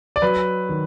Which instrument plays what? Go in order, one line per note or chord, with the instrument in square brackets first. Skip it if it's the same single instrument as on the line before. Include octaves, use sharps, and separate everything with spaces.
[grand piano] D5
F#3 B4
D#3